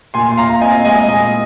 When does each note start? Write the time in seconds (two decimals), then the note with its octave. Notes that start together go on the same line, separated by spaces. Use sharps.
0.14 A#2 G#5 C6
0.31 C6
0.37 A#2 F5 A#5
0.49 A#5
0.61 C4 D#5 G#5
0.85 G#3 D#5 G#5
1.08 A#2 D#5 G#5